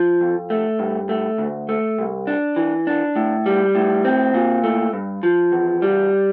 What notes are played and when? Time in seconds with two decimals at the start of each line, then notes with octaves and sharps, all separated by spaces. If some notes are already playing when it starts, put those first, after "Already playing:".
Already playing: F3
0.21 F2
0.50 A3
0.79 G2
1.09 A3
1.38 D2
1.69 A3
1.99 C2
2.27 D4
2.56 E3
2.87 D4
3.16 A2
3.46 G3
3.75 A2
4.05 C4
4.34 A#2
4.63 A3
4.93 G2
5.23 F3
5.52 E2
5.82 G3